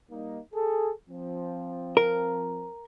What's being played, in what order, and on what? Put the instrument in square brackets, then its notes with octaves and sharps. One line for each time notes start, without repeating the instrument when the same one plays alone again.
[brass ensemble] G3 A#3 D#4
G#4 A4
F3 C4
[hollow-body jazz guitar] A#4